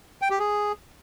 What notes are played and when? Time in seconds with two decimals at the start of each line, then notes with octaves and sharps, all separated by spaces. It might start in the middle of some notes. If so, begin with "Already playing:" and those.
0.22 G5
0.30 G4
0.39 G#4